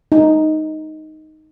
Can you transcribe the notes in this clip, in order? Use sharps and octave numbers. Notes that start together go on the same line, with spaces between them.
D#4